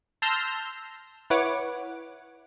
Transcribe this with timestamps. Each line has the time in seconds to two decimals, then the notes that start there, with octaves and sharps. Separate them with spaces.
0.22 A5 C6 E6 F6 G6 A#6
1.30 E4 B4 C#5 F#5 D6